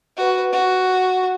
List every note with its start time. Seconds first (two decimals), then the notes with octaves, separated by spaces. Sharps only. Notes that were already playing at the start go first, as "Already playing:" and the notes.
0.17 F#4 B4
0.53 F#4